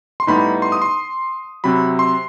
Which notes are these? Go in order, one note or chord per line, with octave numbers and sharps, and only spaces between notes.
C6
A2 G3 B3 D#4 B5
C6
D#6
C6
C3 F#3 C4 B5
C6